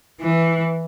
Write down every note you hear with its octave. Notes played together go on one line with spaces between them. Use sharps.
E3